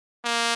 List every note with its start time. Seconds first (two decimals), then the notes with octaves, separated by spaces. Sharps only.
0.25 A#3